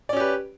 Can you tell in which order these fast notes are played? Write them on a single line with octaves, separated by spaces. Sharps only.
D5 C#4 G4 B4